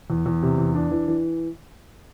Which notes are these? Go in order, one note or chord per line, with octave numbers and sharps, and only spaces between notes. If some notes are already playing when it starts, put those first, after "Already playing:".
E2
E2
C3
E2
D4
E3
E3